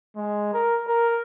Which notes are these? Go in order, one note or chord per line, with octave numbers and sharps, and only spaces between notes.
G#3
A#4
A#4